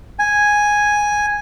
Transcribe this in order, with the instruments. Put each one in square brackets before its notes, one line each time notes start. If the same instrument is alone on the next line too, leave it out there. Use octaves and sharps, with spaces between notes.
[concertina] G#5